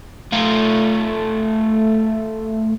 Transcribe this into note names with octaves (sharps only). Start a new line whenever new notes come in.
A3 F4